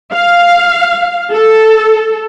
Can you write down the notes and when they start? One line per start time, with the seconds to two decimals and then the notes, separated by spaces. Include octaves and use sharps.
0.14 F5
1.33 A4